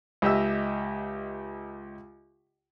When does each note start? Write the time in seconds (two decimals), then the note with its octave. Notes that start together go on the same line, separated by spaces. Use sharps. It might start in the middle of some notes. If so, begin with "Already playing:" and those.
0.22 C#2 G4 D#5 E5 E6